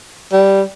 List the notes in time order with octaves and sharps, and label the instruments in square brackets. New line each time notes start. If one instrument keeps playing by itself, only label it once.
[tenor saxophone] G3